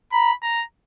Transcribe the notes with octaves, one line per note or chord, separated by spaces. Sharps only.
A#5 B5
A#5